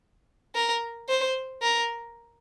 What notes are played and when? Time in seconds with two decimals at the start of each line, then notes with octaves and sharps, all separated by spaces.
0.55 A#4
1.09 C5
1.62 A#4